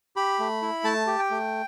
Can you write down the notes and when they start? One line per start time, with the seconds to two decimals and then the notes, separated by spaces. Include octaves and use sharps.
0.16 G4 B5
0.39 A3
0.62 E4
0.84 A3 A5
1.07 G4
1.19 G5
1.30 A3